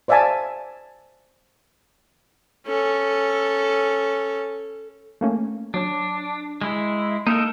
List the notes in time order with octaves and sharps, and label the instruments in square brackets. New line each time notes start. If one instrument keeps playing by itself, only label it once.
[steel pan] C5 D5 E5 F5 G#5 A5
[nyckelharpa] C#4 A4
[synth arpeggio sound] A3 A#3 C#4
[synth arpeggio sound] F#3 C#5 [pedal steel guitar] D4
[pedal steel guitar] G#3 E4
[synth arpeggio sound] A#3 [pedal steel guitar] D#4 A4 A#4